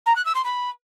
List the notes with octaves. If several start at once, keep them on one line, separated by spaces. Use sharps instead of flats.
A#5
F#6
E6
C6
B5